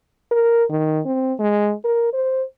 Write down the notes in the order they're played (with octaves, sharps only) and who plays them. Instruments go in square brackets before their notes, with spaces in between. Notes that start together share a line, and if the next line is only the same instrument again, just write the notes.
[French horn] A#4
D#3
C4
G#3
A#4
C5